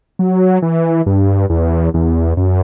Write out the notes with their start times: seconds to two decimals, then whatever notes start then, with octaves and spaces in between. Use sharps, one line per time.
0.19 F#3
0.62 E3
1.06 G2
1.50 E2
1.94 E2
2.37 F#2